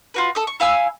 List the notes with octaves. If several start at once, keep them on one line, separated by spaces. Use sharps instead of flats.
F4 F#4 B4
A4 D#6
C#6
E4 F5 G#5 E6